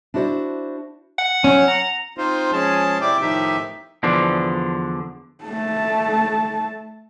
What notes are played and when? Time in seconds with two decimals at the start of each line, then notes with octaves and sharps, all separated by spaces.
0.14 D4 E4 F#4 C5 D5
1.18 F#5
1.44 F#3 C#4
1.68 A#5
2.18 C4 D#4 F4 C5
2.52 F3 G#3 C#4 G#4 A5
3.01 C3 E4 D5 G5 D6
3.21 A2 D#3 F3 D#4 G4 E5
4.03 E2 D3 F3 D4
5.45 A3 A5